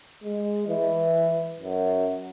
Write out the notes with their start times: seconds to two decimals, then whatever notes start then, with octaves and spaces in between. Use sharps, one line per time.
0.24 G#3
0.68 E3
1.60 F#2